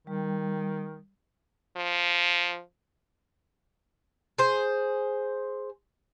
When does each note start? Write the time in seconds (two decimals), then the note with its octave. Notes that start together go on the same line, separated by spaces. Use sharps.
0.07 D#3 G3
1.77 F3
4.38 G#4 C5